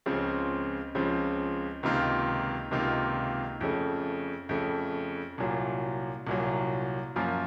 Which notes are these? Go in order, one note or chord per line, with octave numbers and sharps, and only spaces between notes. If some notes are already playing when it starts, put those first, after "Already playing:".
C#2 C#3 F3 C4
C#2 C#3 F3 C4
C#2 C3 D#3 A#3 F4
C#2 C3 D#3 A#3 F4
F2 C#3 A3
F2 C#3 A3
C2 A#2 F#3
C2 A#2 F#3
F#2 F3 A#3 F4